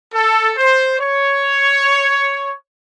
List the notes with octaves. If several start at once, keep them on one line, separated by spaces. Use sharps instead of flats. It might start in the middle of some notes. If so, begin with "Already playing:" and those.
A4
C5
C#5